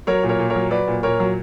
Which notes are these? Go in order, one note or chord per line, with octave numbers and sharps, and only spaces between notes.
F#3 A#4 C#5
A#2
A#4 C#5
A#2
A#4 C#5
F#3
F#3 B4 D5
A#2
A#2 A#4 C#5
F#3